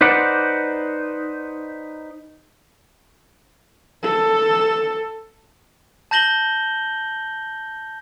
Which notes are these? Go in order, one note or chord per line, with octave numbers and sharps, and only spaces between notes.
D#4 B4 C5 D5 F#5
A4
A5 G6 A#6 F#7 G7